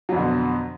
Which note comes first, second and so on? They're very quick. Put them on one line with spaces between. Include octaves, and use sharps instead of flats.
F#3 F2 D3 B2